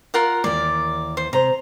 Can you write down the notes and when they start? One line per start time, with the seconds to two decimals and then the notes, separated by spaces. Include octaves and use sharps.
0.14 F4 A#4 F#5
0.44 D#2 E3 A#3 D5
1.17 C5
1.33 C3 C5 A#5